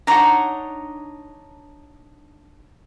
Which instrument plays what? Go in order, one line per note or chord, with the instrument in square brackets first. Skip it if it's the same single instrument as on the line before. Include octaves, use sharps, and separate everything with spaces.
[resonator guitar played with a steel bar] D4 D#4 F#5 [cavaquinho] C#5 A#5